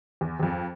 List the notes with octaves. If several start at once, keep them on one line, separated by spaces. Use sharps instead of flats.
E2
E2
F2